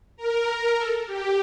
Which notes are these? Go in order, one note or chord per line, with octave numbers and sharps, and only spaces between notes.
A#4
A4
G4